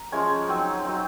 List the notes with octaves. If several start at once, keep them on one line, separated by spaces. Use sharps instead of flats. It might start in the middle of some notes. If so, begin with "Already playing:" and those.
Already playing: A#5
F3 G#3 C#4 G#5
F#3 C4 D#4
F#3 C4 D#4